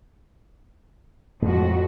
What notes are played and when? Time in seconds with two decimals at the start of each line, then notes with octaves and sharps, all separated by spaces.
1.42 F2 A2 G#3 F#4